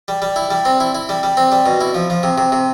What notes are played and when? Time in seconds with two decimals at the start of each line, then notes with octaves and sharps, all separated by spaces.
0.08 G3
0.22 G3
0.36 E4
0.51 G3
0.65 C4
0.80 E4
0.95 E4
1.09 G3
1.23 G3
1.37 C4
1.52 G3
1.66 B2
1.81 E4
1.94 F3
2.10 F3
2.23 C3
2.38 C3
2.52 C3